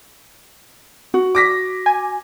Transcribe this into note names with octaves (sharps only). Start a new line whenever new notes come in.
F#4
D6 A#6 B6
G#5